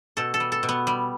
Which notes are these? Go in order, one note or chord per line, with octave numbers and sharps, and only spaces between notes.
B2 A4
A4
G3
A4
B2
B3
G3